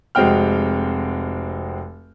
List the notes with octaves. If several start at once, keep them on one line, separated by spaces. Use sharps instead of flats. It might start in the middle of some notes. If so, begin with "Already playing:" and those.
F1 G#3 C4 F#4 G5 F6